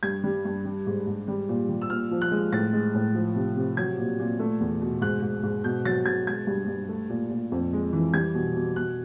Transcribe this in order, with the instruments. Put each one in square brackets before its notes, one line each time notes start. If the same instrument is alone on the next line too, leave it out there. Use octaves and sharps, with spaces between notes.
[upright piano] G2 G#6
G3
G2
G3
G#2
G#2
G3
A#2
G3
E6
A#2 F6
F3
F#6
G#3
A2 A6
G#3
A2
F3
C3
C3
F#3 G#6
A#2
A#2
A3
E2
B2
G#2 F#6
G#2
G#2
B2 G6
F#3 A6
B2 G#6
G#3 G#6
G2
G2
A3
A#2
A#2
F2
G#3
E3
G3 G#6
B2
B2
B2 F#6